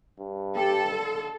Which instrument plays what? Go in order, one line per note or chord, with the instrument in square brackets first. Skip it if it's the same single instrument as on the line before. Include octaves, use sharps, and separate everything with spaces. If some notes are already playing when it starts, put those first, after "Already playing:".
[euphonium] G2
[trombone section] G3 G4 [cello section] A4
[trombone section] D#2 D3